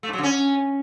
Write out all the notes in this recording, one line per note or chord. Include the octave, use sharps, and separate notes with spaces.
A3
G#2
F#3
D3
C#4